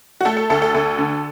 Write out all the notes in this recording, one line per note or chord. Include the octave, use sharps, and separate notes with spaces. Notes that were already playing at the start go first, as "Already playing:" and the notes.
F#4
A3 A4
A4
D2 A4
A4
D2 A4
D3